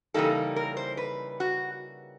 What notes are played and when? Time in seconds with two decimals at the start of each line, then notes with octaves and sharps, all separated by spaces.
0.14 C#3 E3 G3 A#3 D#4 A4
0.56 A#4
0.77 C5
0.97 B4
1.40 F#4